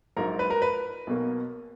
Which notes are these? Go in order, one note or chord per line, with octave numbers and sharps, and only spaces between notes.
A#1 G#2 F#3 A#3 A#4
B4
A#4
B4
B1 B2 A#3